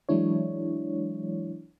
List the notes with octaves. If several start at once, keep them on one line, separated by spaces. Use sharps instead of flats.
E3 F#3 G#3 D4 E4 C#5